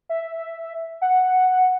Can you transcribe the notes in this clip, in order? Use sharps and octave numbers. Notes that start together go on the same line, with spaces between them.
E5
F#5